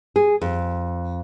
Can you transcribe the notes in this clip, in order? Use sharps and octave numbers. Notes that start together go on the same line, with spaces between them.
G#4
F2